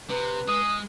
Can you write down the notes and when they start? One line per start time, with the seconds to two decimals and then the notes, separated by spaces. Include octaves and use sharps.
0.10 C3 B4
0.48 G#3 D#6